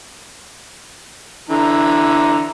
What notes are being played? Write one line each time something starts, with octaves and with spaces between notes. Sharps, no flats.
D3 E3 A#5